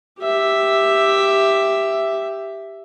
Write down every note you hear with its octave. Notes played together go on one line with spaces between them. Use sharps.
G4 E5